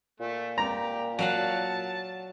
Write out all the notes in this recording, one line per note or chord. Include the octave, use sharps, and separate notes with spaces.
A#2 A3
G4 A#5
F#3 F5 F#5 A5